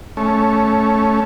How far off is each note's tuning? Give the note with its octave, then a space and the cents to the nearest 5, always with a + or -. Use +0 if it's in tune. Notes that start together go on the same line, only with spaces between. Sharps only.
A3 -10 C#4 +0